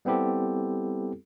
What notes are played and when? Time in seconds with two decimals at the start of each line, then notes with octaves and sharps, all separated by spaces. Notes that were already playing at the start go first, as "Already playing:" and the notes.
0.05 G3 B3 C4 E4 G4 A4